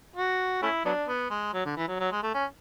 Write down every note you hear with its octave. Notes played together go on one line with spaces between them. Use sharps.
F#4
A3 C#4 E4
F#3 B3 D4
B3
G#3
F#3
D3
E3
F#3
F#3
G#3
A3
C#4